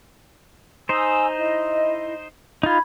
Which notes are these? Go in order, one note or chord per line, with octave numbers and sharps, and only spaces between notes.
D#4 C5 G#5 D#6 E6
E4 D#5
D#4 F4 B5 G#6